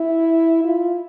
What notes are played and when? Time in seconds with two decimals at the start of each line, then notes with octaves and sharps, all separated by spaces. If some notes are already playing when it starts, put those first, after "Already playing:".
Already playing: E4
0.64 F4